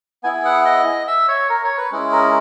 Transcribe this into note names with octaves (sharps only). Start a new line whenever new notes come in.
B3 E4 G#4 G#5
F#5
D#5
E5
C#5
A#4
C#5
B4
G#3 C#4 E4 G#4
A#4